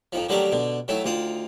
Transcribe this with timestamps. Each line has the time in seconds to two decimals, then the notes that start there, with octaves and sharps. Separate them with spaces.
0.12 F2 D#3 F3
0.29 D3 D#3 F#3 G3 A3 A#4
0.52 B2 D3
0.88 D#3 F#3 A3 E4
1.04 D2 D#3 F4 D#6